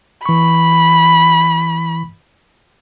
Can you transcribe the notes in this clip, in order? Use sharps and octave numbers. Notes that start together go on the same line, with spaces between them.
E3 B5 C#6